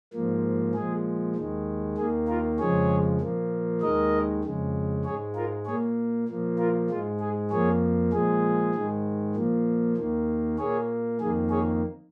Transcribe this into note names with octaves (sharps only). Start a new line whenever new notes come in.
G#2 F3 A#3
A#2 F3 G#3 G#4
D#2 D#3 G#3
D#2 D#3 A#3 G#4
F4 A#4
F2 C#3 F3 G#3 G#4 C#5
A#2 F3 A#3
D#2 D#3 G#3 A#4 D#5
F2 C#3 G#3
G#2 G#3 G#4 C#5
F4 A#4
A#2 A#3 G#4 C#5
A#2 F3 A#3
F4 A#4
G#2 G#3 F4
G#4
F2 F3 A#3 G#4 C#5
A#2 F3 G#3 G#4
G#2 D#3 G#3
A#2 F3 A#3
D#2 D#3 A#3
A#2 A#3 G#4 C#5
F2 D#3 A#3 G#4
G#4 C#5